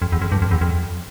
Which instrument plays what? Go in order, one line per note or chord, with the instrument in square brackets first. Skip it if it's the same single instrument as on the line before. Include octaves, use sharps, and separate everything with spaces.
[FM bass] F2
E2
F2
G2
F2
E2
F2